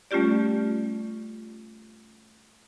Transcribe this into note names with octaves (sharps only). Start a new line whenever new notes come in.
G3 A3 C#4 F4 G4 D5